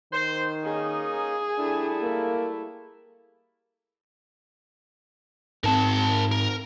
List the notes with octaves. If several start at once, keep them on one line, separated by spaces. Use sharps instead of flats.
D#3 C5
A#3 C#4 D#4 G#4
G3 A3 D4 E4
A#3
G#2 C4 A#4 A5
A#4